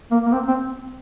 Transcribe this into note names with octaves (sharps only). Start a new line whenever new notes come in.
A#3
A#3
C4
C4